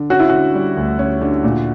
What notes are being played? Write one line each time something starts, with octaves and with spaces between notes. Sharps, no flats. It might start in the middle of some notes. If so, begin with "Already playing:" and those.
Already playing: D3
C#4 F#4
E4
D3 F#4
G3
D2
C#4
D3
A#2